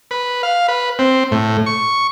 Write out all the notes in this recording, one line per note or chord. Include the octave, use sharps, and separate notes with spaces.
B4
F5
B4
C4
A2
C#6